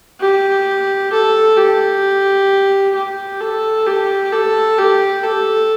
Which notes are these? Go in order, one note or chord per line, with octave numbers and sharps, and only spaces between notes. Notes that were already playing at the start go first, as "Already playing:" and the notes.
G4
A4
G4
G4
A4
G4
A4
G4
A4